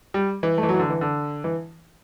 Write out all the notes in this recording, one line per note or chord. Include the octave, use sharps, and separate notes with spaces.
G3
E3
A3
E3
F#3
E3
D3
E3
D3
E3